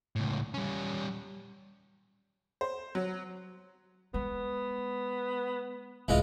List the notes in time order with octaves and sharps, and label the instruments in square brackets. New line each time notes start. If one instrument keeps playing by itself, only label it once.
[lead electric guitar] C#2 A2
G3 C#4
[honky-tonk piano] C5
F#3
[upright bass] G#3 [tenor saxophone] B3
[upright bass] C#2 A2 [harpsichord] E3 G#3 F4